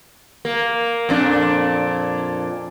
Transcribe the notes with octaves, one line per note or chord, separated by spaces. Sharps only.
A#3
F2 A#2 D4